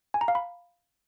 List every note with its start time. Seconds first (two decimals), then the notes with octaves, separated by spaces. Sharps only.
0.14 G#5
0.21 A#5
0.28 F5
0.35 B5